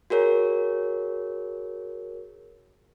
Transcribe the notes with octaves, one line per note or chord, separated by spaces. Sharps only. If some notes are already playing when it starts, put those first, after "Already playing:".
F#4 G#4 A#4 C#5